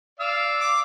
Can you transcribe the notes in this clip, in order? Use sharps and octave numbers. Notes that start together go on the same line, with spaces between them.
D5 F5 E6
D6